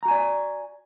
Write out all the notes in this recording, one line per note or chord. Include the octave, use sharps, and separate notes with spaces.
F#4 D5 G#5 A#5